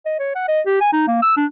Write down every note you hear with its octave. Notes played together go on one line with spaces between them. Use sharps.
D#5
C#5
F#5
D#5
G4
G#5
D#4
A#3
E6
D4